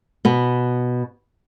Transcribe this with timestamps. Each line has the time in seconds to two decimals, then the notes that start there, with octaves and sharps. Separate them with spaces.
0.25 B2 B3